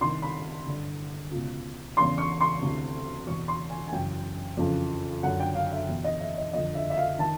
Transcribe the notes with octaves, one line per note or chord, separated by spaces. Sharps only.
C2 C3 D#3 C6
B5
G2 D3
C#2 B2
E2 C#3 E3 C6
C#6
C6
D2 C3 E3
E2 B2 C#6
C6
G#5
G#5
F#2 C#3 E3 G5
F2 C#3 E3
F#2 D3 F#5
G5
F5
E5
E2 B2
D#5
E5
D#5
F2 D3 D#5
E5
E5
F5
D#3 A5